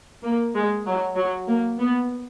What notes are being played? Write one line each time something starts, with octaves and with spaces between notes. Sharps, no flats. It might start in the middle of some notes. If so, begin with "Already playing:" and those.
A#3
G#3
F#3
F#3
A#3
B3